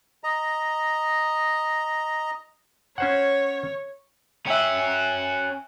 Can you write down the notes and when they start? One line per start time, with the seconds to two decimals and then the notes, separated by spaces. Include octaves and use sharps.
0.24 D#5 A#5
2.98 C#4 C5 C#5 F#5
4.46 C#4 F#4 E5 G5